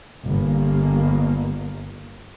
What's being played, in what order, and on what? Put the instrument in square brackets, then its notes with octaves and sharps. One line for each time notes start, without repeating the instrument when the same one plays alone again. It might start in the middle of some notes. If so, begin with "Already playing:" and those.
[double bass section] G1 G2 A#3